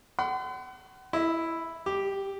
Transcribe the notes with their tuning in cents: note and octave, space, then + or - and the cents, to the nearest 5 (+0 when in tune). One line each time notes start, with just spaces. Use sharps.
F#5 +35 C6 -45
E4 +0 D#5 +40
G3 +40 G4 +0